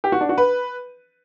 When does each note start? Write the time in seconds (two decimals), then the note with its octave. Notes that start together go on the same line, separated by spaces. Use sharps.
0.04 G4
0.12 F#4
0.21 D4
0.29 F#4
0.38 B4